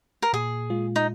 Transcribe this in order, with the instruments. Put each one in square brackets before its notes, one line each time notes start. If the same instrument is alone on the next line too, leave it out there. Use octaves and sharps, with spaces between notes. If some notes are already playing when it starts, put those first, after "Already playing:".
[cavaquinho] A#4
[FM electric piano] A#2 [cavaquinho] G#4
[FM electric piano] G#3 F4
[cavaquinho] D#4